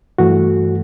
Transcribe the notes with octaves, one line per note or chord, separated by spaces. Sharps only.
G2 E3 A3 F#4